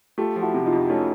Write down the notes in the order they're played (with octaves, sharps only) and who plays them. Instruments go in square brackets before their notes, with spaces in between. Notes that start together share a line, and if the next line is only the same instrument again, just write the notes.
[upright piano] A3 [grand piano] F4 G4
[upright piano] F3
[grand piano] E4 F#4
[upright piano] C3
[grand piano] D#4 F4
[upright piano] F2
[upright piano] A3 [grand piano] C#4 D#4